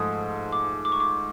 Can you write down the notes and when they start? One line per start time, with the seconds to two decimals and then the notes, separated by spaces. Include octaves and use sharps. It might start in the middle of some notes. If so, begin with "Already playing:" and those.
Already playing: G#2 F3 A3 D#6
0.52 D6
0.85 D6
0.92 C#6
1.00 D6